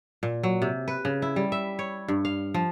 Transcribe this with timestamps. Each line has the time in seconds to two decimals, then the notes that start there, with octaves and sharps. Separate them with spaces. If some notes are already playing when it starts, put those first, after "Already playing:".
0.23 A#2
0.43 F#3
0.62 C3
0.88 B4
1.05 C#3
1.22 E4
1.36 G3
1.52 E5
1.79 C#5
2.08 G2
2.25 F5
2.54 F3